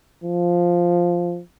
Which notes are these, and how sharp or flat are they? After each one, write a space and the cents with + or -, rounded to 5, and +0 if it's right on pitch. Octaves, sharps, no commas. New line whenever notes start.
F3 +0